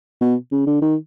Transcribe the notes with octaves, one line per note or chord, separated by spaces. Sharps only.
B2
C#3
D3
D#3